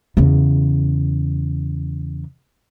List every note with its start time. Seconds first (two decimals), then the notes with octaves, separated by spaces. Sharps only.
0.17 E2 C#3